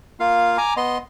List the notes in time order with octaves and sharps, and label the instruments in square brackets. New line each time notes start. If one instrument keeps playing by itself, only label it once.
[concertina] A#3 F4 F5
G#5 A#5 D6
B3 D#5 C6